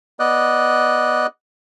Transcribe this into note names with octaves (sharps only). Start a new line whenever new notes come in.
B3 D5 D#5 F#6